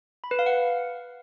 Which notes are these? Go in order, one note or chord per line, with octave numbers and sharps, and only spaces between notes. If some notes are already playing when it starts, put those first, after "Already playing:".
B5
B4
F5
F#5